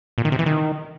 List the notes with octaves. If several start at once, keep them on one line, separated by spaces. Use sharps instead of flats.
A#2
D#3
C3
E3
D#3